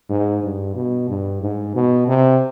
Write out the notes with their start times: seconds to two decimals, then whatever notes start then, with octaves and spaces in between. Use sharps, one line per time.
0.09 G#2
0.43 G2
0.75 B2
1.09 G2
1.42 G#2
1.75 B2
2.08 C3